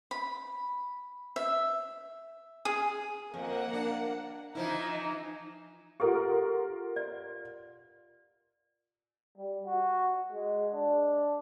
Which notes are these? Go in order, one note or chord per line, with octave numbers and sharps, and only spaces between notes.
B5
E5
G#4
F2 A#3 F#5
D4
E3 F3 D#4 E4
F4 G4 A4 A#4 F#5
D5
G3
F#4
G#3
D4